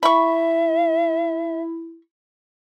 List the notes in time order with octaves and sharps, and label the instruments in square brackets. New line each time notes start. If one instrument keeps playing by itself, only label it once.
[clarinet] E4 [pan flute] E5 [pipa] B5 C#6